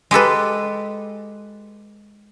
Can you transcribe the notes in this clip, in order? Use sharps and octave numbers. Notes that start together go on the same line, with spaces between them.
G#3 G4 A4 B4